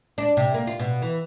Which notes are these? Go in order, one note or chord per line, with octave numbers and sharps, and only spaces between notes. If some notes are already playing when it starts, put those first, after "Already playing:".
D4
C3
A#3
F4
B2
E3